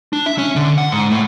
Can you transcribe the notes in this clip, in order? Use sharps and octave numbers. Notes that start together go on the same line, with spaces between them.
D4
E5
C#4
D3
F#5
G#2
A2